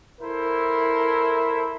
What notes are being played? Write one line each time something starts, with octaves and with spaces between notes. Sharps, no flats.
E4 A4 A#4 C5 E5